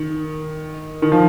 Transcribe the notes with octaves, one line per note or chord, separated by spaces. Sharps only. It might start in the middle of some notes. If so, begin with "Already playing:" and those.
Already playing: D#3
D#3
F3